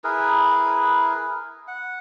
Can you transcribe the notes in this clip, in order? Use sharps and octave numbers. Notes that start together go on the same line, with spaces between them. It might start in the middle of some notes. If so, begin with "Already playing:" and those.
E4 G#4 A#4 B4
F#5